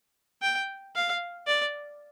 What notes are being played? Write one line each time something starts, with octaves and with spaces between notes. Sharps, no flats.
G5
F5
D5